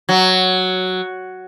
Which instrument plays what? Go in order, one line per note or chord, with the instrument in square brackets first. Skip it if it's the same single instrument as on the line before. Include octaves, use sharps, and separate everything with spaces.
[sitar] F#3